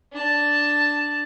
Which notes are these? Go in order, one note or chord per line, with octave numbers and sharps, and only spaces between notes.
D4 A5